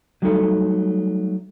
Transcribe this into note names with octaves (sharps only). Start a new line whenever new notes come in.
F#3 G3 A3 D#4 G#4 A4